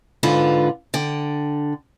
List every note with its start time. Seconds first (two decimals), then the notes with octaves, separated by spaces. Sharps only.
0.23 G#2 D3 F4 B4
0.94 D3 G5